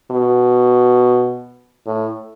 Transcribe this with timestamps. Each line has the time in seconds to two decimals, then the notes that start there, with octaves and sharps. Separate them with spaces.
0.11 B2
1.86 A2